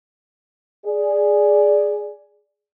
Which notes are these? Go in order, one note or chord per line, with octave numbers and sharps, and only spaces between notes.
G#4 D5